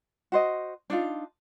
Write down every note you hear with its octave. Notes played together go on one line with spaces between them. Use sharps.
F#4 C5 D#5
D4 D#4 F4